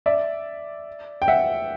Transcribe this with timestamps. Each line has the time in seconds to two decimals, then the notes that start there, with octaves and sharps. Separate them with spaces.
0.06 D5 E5
1.22 G5
1.28 E5 F#5